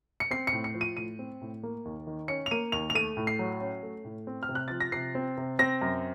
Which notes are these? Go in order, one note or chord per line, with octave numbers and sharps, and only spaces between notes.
C#7
C4 C7
C#7
A2
C#7
F3
D#7
A2 D#7
C4
A2
A#3
D#2
D#3
C#4 C#7
F7
A#3 D#7
D#2 F7
F7
A3 D#7
A2
C7
F#3
C#4
A3
A2
C4
F6
C3
F#6
F3 A6
A#6
C3 C7
C4
C3
C4 A#6
F#2